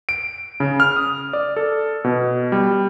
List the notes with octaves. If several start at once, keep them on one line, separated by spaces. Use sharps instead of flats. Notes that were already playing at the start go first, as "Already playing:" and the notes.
D7
C#3
F6
D#6
D5
A4
B2
G3